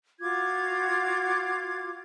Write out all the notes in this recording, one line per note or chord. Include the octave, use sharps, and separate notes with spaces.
F4 F#4 D6 G#6